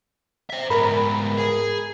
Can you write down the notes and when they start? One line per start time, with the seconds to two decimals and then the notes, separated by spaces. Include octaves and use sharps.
0.50 C5 E5
0.70 G#2 B3 A#4 B5
1.37 G#4